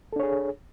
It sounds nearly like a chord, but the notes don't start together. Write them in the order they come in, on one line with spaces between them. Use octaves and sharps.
A4 D4 C#5 G#4